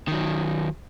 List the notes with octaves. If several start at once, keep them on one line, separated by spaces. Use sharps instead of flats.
D#3 F#3